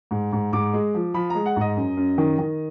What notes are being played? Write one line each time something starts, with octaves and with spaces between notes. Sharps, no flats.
G#2
G#2
G#2 D6
G#3
F3
F3 B5
G#3 A#5
F#5
G#2 D#5
F#2
F#2
D#3
D#3